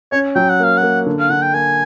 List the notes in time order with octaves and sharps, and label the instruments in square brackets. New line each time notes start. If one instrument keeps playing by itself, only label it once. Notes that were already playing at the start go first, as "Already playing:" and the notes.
[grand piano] C#4 [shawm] C#5
[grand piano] F#3 [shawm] G5
[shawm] F#5
[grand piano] A#3 [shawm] F5
[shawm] F#5
[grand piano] A#3
D3
[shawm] F5
[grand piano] D3 [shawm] F#5
[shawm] G5
[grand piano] A#3 [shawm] G#5